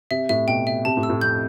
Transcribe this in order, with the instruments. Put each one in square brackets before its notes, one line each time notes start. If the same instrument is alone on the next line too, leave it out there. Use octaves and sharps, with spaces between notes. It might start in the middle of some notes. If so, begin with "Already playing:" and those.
[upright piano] C3 [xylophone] E5
[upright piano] A2 [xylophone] E5
[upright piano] B2 [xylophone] G5
[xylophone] E5
[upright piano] C3 [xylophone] A5
[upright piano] A2
[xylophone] E6
[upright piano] A2
[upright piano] F2 [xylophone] G6